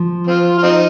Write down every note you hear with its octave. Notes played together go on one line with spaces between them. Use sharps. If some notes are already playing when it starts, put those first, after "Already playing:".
Already playing: F3
C4 F4
F4
C4 D#4